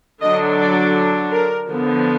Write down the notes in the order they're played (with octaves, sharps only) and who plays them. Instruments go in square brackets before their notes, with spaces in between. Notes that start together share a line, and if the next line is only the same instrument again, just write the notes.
[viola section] D3 F#3 D4 D#5
D5
A#4
D3 F3 B3